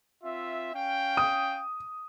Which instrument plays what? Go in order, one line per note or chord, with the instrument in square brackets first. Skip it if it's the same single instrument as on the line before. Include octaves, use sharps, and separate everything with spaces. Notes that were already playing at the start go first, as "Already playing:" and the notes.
[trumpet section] C4 F4 E5
C#4 F5 G5
[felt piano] D#6